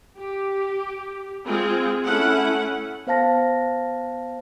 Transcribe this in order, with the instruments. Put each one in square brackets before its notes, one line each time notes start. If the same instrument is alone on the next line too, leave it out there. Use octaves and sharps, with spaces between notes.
[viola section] G4
G#3 C4 F4 G#4
A3 C#4 E4 F#5
[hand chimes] B3 C5 F5 A5 A#6